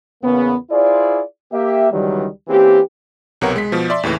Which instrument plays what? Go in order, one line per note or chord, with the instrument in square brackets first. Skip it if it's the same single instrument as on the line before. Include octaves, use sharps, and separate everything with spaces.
[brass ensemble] E2 C#3 A#3 B3
E4 F4 G#4 C5 D5
A#3 G4 E5
C#2 D#3 E3 F#3 G3
E3 A#3 C4 C#4 G4
[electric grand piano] B1 C3 B3 A#4 C#5 F#5
G#3 B6
B2 F3
D5 E5 C6
D#2 A2 C#3 E3